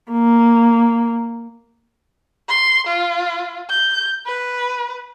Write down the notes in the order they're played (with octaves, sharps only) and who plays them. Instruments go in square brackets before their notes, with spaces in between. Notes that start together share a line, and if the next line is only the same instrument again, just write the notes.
[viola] A#3
[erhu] C6
F4
G6
B4